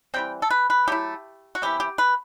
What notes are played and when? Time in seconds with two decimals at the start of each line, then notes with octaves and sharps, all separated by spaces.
0.14 E3 G3 C4 G5
0.42 A4
0.50 B4
0.70 B4
0.88 F#3 A3 E4 G4
1.55 F#4
1.62 C3 E3 B3 E4 G4
1.80 G4
1.98 B4